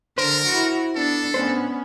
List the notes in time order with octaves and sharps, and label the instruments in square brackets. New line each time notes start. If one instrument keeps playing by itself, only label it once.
[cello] D3 [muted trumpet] A#4 [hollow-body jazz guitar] C5
[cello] E4 F#4
[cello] B3 D4 [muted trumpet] A4
[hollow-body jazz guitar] A2 D4 C5 [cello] B3 C#4